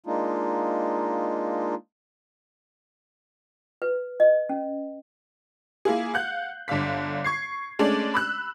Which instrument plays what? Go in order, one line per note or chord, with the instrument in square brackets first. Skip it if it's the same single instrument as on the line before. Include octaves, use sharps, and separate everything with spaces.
[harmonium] G#3 A#3 D4 D#4 F4
[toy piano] B4
D#5
C#4
[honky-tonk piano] A#3 E4 F4 G#4
F5 F#5 F#6 G6
G1 D3 D4 F5 B6
C#6 G#6 C7
G#3 A3 C#4 D4 D5
B5 E6 F#6